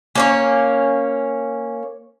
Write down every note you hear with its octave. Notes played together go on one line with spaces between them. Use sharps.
A#3 C#4 C#5